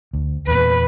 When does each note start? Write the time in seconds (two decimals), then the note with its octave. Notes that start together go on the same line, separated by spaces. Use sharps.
0.13 D2
0.47 E2 A#2 B4